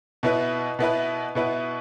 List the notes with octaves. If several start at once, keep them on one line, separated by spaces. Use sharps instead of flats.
B2 B3 E4 B4
B2 B3 E4 B4
B2 B3 E4 B4